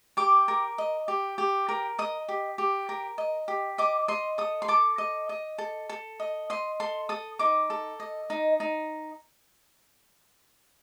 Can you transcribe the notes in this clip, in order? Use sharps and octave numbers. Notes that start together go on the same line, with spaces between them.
G4 D6
A#4
D#5
G4
G4
A#4
D#5 D#6
G4
G4
A#4
D#5
G4
D#5 D6
D#5 C6
A4 D#6
C6
A4 D6
D#5
D#5
A4
A4
D#5
D#5 C6
A4 C6
A4 D#6
D#4 D6
A4
D#5
D#4
D#4